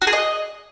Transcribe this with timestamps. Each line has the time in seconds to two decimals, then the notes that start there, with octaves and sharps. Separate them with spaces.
0.02 F#4
0.07 G#4
0.13 D#5